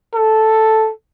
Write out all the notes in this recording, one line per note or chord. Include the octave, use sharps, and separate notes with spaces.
A4